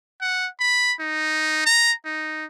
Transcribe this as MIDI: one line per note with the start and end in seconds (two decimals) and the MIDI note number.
0.21 0.48 78
0.60 0.93 83
1.00 1.64 63
1.66 1.92 82
2.05 2.45 63